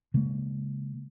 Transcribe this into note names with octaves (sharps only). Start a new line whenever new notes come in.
C#3 G#3 A#3